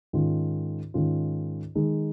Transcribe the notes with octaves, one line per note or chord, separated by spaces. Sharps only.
G#2 D#3 C#4 F4
G#2 D#3 C#4 F4
D#3 G#3 D#4